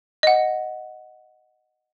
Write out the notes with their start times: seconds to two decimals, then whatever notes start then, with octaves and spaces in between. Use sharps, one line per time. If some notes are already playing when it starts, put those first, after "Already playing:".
0.23 D#5 F#5